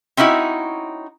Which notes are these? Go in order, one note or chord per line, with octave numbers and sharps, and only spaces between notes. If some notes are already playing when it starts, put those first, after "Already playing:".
C4 C#4 D#4 E4 F#4